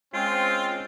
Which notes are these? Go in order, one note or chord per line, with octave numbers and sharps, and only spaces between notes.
G#3 C4 C#4 F4 G5